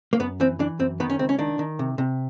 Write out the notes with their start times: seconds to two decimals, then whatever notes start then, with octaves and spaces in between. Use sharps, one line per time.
0.13 A#3
0.20 F#2 B3
0.40 E3 C4
0.59 E3 D4
0.79 F#2 C4
1.00 D#3 B3
1.10 C#4
1.19 C#2 C4
1.29 C#4
1.39 D#3 D4
1.59 D#3
1.79 C3
1.98 C3